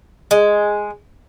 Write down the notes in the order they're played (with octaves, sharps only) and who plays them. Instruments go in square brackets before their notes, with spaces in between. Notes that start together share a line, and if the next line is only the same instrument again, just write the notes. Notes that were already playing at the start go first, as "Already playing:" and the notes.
[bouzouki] G#3